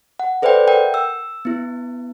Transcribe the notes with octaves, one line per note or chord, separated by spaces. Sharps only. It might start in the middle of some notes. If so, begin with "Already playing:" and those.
F#5
A4 B4 C5 D5 E5 G5
A#4 F#5 G5
E6
B3 E4